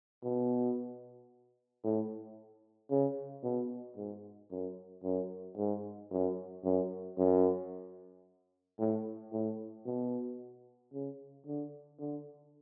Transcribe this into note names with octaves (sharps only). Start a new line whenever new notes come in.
B2
A2
C#3
B2
G#2
F#2
F#2
G#2
F#2
F#2
F#2
A2
A2
B2
C#3
D3
D3